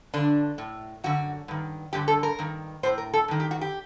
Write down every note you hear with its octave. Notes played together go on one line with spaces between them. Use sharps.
G2 D3 D4
A2
F#2 D3 F#4
G2 D#3
G2 D3 G4
A4
A#4
G2 D#3
A2 C5
A#4
A4
G2 D#3
G4
F#4
G4